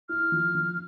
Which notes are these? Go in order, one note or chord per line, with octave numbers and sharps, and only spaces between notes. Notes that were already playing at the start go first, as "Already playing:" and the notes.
E4 F6
F3
F3